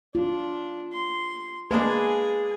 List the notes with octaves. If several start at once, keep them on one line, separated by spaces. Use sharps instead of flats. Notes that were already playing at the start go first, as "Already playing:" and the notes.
D4 F4
C6
G#3 A#3 D4 G#4 B4 G#5